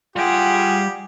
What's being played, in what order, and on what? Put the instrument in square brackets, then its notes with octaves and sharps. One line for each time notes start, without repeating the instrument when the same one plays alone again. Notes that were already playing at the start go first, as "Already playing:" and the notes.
[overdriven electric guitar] G3 G5 [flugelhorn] F4 [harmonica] G4 [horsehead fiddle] G#4 F#5